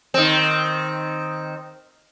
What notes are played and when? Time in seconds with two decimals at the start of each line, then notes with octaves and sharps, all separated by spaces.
0.14 D#3 C4